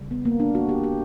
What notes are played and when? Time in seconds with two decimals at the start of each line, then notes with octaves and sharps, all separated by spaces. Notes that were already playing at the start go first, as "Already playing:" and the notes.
Already playing: C#3 G3
0.11 B3
0.25 A#3
0.40 D4
0.55 F#4
0.69 G4
0.83 G4